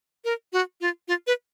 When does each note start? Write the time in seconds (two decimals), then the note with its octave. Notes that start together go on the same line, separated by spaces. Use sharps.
0.25 A#4
0.53 F#4
0.81 F4
1.08 F4
1.27 B4